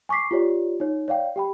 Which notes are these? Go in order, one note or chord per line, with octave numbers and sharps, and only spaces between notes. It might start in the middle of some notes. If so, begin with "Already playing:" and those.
G#5 C#6 D6 B6 C7
F4 G4 C#5 D5
D#4 C#5
C#5 D5 F5 G5
G4 G5 B5